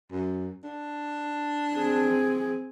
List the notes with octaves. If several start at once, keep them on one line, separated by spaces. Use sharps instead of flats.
F#2
D4
C4 G#4